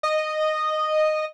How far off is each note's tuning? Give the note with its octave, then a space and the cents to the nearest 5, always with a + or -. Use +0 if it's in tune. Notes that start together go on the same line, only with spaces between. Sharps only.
D#5 -10